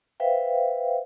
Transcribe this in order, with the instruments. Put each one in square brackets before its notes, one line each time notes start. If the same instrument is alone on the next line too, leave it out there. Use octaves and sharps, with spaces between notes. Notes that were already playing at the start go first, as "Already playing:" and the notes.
[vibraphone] B4 C5 E5 F5 G5